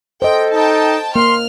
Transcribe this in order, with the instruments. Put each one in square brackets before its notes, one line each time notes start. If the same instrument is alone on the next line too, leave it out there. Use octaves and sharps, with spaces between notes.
[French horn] A4 [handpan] C5 D#5 [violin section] G5
[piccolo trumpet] D#4 [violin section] G5 A5
[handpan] A#3 [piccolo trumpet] C6 [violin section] F6